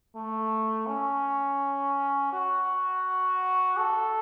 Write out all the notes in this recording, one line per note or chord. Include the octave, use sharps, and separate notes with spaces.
A3
C#4
F#4
A4